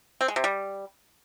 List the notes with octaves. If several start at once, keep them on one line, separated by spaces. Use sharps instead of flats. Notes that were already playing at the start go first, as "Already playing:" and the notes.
C4
G#3
C3
G3